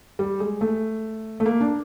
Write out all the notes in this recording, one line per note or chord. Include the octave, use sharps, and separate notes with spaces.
G3
G#3
A3
A3
A#3
D4